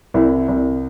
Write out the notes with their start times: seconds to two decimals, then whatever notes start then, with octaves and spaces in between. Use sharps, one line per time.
0.14 C2 E4
0.48 C2